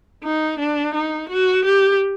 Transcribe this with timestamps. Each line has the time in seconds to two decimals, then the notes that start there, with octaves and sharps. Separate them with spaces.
0.24 D#4
0.59 D4
0.94 D#4
1.29 F#4
1.65 G4